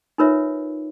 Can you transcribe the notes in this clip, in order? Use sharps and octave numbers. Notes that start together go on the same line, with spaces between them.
D#4 F4 A#4 B4 C#5 E5